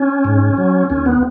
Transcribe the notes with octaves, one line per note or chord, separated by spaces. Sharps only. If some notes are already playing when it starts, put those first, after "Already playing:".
Already playing: C#4
G#2
F#3
D#2 C#4
B3